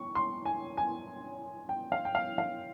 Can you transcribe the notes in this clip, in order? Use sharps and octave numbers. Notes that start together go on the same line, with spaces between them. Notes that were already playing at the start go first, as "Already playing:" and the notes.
Already playing: C#6
C6
G#5
G#5
G5
F5
G5
F5
F5